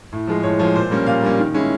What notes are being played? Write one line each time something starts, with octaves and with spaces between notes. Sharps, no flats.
A2
F3 G#3
A2 C#5
F3 G#3 C#5
A#2 C5
G3 A#3 C#4
A#2 F5
G3 A#3 C#4
D#3
G#3 C#4 E4